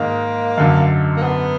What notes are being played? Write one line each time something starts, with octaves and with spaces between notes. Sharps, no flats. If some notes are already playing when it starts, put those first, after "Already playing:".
Already playing: G#2 D#3 G#3 A#3
F#2 D3 F#3
A#3
B3